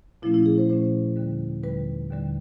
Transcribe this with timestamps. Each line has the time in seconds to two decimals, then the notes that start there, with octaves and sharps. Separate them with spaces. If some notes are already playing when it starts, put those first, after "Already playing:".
0.22 A#2 F3 A3 C#4 E4
0.34 E4
0.46 G#4
0.58 C5
0.70 A#2 F3 A3 C#4 C5
1.16 D#2 D3 G3
1.63 D#2 D3 G3 B4
2.10 D#2 D3 G3